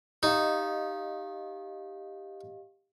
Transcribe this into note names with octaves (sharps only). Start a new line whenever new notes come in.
D#4 G4 D#5 F5